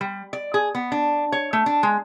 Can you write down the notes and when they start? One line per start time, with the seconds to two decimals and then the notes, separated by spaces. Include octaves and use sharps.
0.01 G3
0.33 D5
0.54 G#4
0.75 B3
0.92 D4
1.32 C#5
1.53 A3
1.66 D4
1.83 G#3